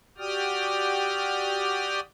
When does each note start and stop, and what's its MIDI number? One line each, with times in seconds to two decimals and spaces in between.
0.18 2.00 66
0.18 2.00 67
0.18 2.00 74
0.18 2.00 79
0.18 2.00 87
0.18 2.00 89